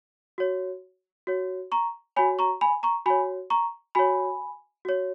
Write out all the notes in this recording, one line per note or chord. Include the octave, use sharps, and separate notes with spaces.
F#4 C#5
F#4 C#5
A#5 C#6
F#4 C#5 G#5 B5
A#5 C#6
G#5 B5
A#5 C#6
F#4 C#5 G#5 B5
A#5 C#6
F#4 C#5 G#5 B5
F#4 C#5